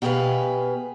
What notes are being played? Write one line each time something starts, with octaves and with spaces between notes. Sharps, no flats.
B2 G4 G#4 A#4 B4 F5